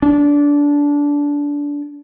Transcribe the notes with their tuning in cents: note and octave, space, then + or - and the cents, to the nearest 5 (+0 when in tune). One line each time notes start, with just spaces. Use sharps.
D4 -20